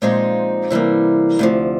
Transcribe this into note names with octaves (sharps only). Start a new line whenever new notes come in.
A#2 F3 G#3 C4 D#4
C3 E3 G3 A#3
D2 C3 F3